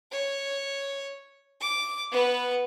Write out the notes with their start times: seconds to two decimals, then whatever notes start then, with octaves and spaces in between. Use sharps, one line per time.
0.12 C#5
1.61 D6
2.12 B3 B4